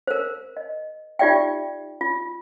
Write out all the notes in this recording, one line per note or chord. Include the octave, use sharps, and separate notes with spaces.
A#4 C5
D#5
D#4 F4 G4 D5 E5 G5
F4